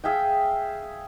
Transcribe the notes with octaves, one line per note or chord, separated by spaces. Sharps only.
G#4 E5 F5 G5